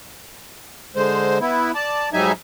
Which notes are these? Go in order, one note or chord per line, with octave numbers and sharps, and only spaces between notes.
D3 G#3 C5
B3 E4
D5 A5
G#2 F#3 G3 D#4 E5 G#5